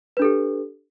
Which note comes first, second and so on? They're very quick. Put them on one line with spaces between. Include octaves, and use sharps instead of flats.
B4 D4 A4 G4